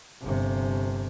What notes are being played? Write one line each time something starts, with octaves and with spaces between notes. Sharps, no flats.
G1 C3